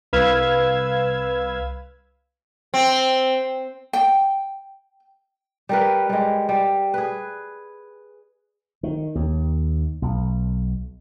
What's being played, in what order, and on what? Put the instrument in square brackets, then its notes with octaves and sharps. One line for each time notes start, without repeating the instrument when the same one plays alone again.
[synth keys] C2 B4 F5 E6 G#6
[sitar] C4
[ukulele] G5
[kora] G3 A#4 B4
G3 G#3
G3
G#4 B4
[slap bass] D#3
D#2
B1